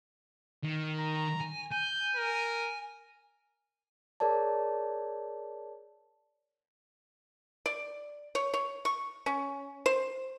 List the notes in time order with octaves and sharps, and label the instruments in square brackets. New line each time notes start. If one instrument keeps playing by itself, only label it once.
[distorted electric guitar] D#3
[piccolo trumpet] A#5
[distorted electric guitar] G#5
[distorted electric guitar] G#5 [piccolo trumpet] G6
[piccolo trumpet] A#4
[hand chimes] G#4 A#4 C#5 D5 A5
[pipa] D5
C#5
C#5
C#6
C#4
C5